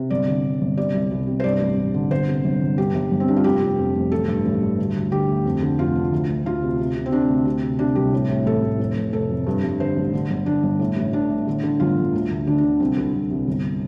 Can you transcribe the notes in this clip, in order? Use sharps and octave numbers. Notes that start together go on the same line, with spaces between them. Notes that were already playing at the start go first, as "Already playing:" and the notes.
Already playing: C3
G1 D5
D3
D3
G1
C3 D5
C2
C2
C3
C5
G2 D5
A1
A1
D3
G1 C5
C3
G1
G1
G2 G4
G1
G1
C4
G2 D4
F4
F1 G4
F1
F2
F1
A1 A4
G2
A1
G2
D2
D2
D3 G4
D2
F2
D3
F1 F4
D3
D2
D2
D2 F4
C3
C3
C3
C4
C3 D4
D2
C3
C3
C3 D4
C2 G4
A2
A2
A1 A4
A2
F1
F1
F1 A4
F2
G2
G2
D3 C5
A1
D3
G1
G1 D4
G1
A2
A1
A2 D4
A2
D3
D3
G1 F4
G1
D2
D2
D3 D4
D4
D3
C2 C4
C2
C2
C2
G1